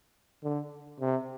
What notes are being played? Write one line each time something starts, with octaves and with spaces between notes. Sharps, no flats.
D3
C3